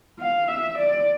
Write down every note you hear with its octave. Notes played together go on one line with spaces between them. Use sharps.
F5
E5
D5